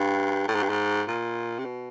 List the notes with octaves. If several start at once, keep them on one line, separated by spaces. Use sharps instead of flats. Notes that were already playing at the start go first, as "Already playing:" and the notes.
Already playing: G2
A2
G#2
G2
G#2
A#2
C3
B2